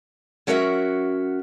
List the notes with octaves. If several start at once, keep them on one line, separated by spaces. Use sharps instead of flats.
F#3 C#4 F#4 A#4 E5 F#5